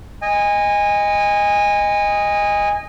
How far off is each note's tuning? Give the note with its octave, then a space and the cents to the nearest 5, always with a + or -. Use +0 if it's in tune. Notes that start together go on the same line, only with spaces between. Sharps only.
D#5 +0 G#5 -25